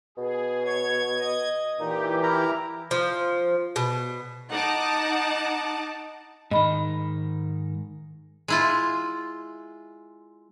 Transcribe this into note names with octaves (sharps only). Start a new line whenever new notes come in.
B2 G#4
C#5 G#6
D#5
A#2 E3 D#4 G4
E4 A#4 E5 A#5
F3
B2
D#4 F#5 A5 D6
G#2 D#3 D#5 B5
G#3 E4 F4